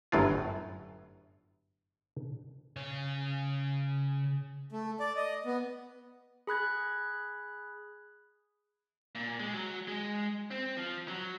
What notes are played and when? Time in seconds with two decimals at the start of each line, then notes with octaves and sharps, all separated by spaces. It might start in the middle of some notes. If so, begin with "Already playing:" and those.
0.12 G1 F#2 A2 F#3 F4
2.76 C#3 C#5
4.72 A3
5.00 D5
5.16 D#5
5.45 B3
6.47 G#4 B5 F#6 G#6
9.15 A#2
9.40 G#3
9.54 F#3
9.88 G#3
10.51 C4
10.77 F3
11.08 F#3